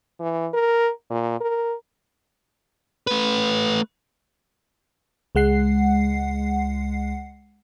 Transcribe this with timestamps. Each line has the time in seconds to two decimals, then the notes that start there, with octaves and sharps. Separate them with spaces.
0.20 E3
0.54 A#4
1.10 A#2
1.41 A#4
3.07 A3 B4
5.35 C#2 G#3 F#5 C7